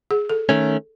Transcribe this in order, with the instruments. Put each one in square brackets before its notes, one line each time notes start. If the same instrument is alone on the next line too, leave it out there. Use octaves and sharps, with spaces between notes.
[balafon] G#4
A4
[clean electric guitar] D#3 A3 C#4